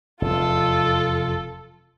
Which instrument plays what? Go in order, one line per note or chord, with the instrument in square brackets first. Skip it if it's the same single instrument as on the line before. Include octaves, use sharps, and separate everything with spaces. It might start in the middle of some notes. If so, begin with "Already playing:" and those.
[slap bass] F1 E2 [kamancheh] F4 A4